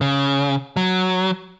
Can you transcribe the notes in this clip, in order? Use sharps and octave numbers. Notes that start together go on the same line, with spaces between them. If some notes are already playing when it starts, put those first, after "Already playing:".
C#3
F#3